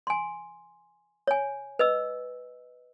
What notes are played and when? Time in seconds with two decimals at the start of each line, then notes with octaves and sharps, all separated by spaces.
0.07 G#5 C6
1.27 C#5 G#5
1.79 B4 D#5 E6